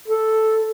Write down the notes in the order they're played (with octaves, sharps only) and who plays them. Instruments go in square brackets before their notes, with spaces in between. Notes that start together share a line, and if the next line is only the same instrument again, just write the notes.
[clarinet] A4